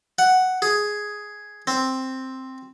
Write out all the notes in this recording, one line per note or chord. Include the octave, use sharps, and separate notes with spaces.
F#5
G#4
C4